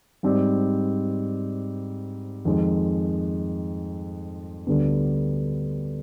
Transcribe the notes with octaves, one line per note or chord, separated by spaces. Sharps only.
G#2 G3 C4
F2 D#3 G#3
D2 D3 G3 B3